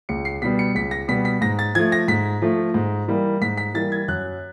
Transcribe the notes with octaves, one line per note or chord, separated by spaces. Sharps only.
C#2 C#7
C7
B2 G3 B3 B6
C#7
C#2 B6
A#6
B2 G3 B3 B6
B6
G#2 A#6
A6
F3 A3 G#6
A#6
G#2 B6
F3 A3
G#2
E3 G3 A#3
G#2 B6
B6
E3 G3 A#3 A6
G#6
F#2 F#6